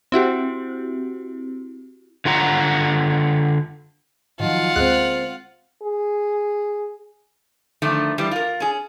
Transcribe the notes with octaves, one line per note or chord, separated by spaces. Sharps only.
C4 E4 F#4 G4
D3 F4 F#5 A#5
D#3 F3 F#3 F4 F#5
D2 G#3 A#3 C4 F#6
G#4
D3 D#3 F3 A3
E3 F3 G3
F4 A#4
C#4 G#4